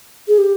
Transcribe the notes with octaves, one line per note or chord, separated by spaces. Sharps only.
G#4
G4